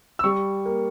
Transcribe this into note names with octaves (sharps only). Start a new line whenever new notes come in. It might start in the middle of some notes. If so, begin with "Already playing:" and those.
E6
G3 C#6
A#3